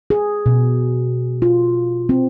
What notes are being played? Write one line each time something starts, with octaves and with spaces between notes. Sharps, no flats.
G#4
B2
F4
C4